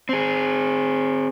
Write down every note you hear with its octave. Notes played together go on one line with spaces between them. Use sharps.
C4 G#4